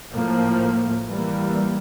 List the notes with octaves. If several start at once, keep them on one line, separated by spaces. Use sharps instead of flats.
A2 F3 A#3
E3 G3 A#3